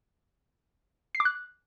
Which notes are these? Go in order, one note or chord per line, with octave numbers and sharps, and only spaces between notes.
C7
D6
F#6